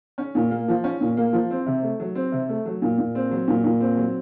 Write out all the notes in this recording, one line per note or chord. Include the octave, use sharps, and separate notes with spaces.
C#4
A#2
A#3
F3
C#4
A#2
A#3
F3
C4
C3
A3
F#3
C4
C3
A3
F#3
A#2
A#2
C4
F#3
A#2
A#2
C4
F#3